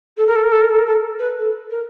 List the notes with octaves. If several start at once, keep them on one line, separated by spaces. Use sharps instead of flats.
A4
A#4
A4
A#4
A4
A#4
A4
A#4
A4
B4
A4
A#4